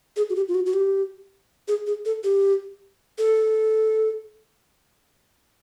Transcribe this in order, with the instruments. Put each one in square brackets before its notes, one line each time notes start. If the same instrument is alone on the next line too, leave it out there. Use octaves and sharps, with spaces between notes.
[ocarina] G#4
F#4
G4
F4
F#4
F#4
G4
G#4
G#4
A4
G4
A4